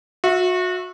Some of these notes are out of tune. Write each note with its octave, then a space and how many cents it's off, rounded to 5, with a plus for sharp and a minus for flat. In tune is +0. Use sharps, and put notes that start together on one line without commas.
F#4 -30 E5 +0